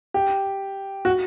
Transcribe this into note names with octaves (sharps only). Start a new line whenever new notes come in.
G4
F#4